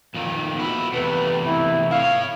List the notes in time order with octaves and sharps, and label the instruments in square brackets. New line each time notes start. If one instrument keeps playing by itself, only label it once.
[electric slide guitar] F2 A#2 D#3
B2 E4
[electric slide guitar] E2 C3 A3 [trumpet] B4
[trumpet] E4
[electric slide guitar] E4 C#5 [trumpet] F5